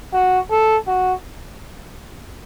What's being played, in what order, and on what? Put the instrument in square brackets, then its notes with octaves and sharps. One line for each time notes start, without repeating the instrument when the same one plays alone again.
[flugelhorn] F#4
A4
F#4